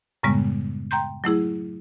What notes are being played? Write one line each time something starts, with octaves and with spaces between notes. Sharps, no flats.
F#2 A2 C#3 G3 G#3 B3
G5 A#5 C6 G6
F#3 A3 E4 G#4